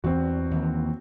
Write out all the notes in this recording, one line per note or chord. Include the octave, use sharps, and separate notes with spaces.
E2 E3 G3 C4 F#4
D#2 E3